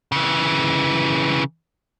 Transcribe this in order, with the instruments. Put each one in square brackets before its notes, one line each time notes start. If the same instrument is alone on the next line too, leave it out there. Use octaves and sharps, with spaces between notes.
[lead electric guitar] C#3 E3